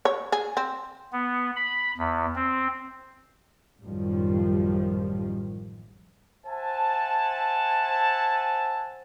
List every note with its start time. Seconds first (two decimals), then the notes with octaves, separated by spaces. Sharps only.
0.05 C#5
0.32 G#4
0.57 C4
1.13 B3
1.56 B5
1.98 E2
2.36 C4
3.83 A1 F#2 D#3 F3 G3
6.46 C5 E5 F#5 G#5 A5